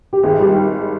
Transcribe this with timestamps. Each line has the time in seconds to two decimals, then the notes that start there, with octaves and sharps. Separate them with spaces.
0.13 G4
0.23 G#1 G#4
0.40 G3 G4